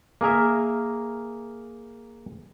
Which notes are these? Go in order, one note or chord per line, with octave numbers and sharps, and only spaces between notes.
A#3 G#4 A#4 E5